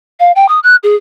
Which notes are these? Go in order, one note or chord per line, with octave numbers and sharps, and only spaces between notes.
F5
G5
D#6
F#6
G#4